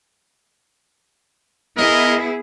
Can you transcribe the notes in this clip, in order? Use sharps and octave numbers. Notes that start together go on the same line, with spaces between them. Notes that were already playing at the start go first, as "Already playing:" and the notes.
B3 E4 G#4 A#4 D#5